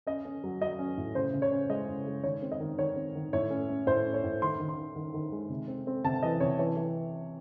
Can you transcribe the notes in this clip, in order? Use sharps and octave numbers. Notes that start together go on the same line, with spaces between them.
C#4 D#5
C#4
F#3
F#3 D#5
C#4
A2
C#3 C5
C#3
C#5
C#4
G#3 D#5
C#3
G#3
D#3 C#5
C4
D#5
D#3
D#3 C#5
C4
D#3
A2 C#5
C#4
C#4
A2 C5
C#4
C#5
A2
D#3 C6
D#3
C6
D#3
D#3
D#3
G#3
C3
C4
C4
C3 A5
E3 D#5
C3 C#5
E3 C#5
E3